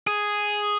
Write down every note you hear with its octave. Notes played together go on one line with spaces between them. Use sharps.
G#4